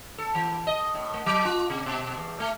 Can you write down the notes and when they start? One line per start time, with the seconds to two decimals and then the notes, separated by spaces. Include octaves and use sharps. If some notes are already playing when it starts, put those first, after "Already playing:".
0.18 A4
0.35 E3
0.67 D#5
0.95 A2
1.14 A3
1.26 F#3
1.45 F4
1.70 C3
1.86 B2
2.18 E2
2.40 A3